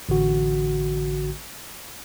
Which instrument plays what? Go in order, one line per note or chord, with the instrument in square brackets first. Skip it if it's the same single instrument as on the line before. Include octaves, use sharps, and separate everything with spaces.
[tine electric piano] A1 D3 F#4